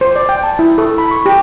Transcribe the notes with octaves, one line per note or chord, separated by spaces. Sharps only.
C5
D5
G5
A5
E4
A4
B5
C#6
G4